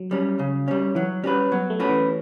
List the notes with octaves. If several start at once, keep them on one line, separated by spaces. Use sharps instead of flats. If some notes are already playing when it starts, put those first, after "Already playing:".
Already playing: F#3
G3 C#4
C#3
G3 C#4
E3 F#3
G3 C#4 F#4 B4
F#3 B3
A3
C#4 F#4 B4
E3